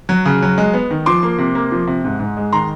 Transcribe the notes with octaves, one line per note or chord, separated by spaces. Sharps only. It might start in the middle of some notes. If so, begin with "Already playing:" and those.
F#3
C#3
F#3
G#3
B3
D#3
F3 C6 D6
A#3
C3
A#3
F3
C3
G#2
G#2
G#3
D#3 A#5 C6